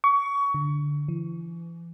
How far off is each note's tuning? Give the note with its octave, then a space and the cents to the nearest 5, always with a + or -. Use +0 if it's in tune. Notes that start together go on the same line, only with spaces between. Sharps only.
C#6 +25
D3 -10
E3 +35